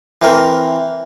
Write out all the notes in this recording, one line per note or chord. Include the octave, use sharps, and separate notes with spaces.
E3 C4 A#4